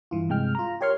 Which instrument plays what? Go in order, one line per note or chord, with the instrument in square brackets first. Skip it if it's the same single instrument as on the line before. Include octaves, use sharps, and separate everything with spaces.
[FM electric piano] G2 E3 F4
G2 C3 G#3 G5 F6
F4 A#5
G4 A#4 C#5 C6 C#6 F6